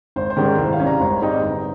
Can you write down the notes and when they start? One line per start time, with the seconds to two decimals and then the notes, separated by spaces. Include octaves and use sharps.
0.16 G#1 C5
0.30 C5
0.36 G#2 D#3 G3 C#4
0.44 C5
0.58 C2
0.73 F5
0.79 C3 G3 C#4
0.87 A#5
1.00 G#1
1.21 G#2 G3 C4 D#4
1.42 G1